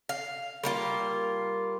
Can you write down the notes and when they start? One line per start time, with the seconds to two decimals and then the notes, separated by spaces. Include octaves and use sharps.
0.09 F5
0.63 G3 A#3 F4